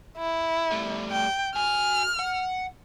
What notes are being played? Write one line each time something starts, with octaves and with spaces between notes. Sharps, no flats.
E4
G3 A3
G5
F#4 G#5 F6
F#5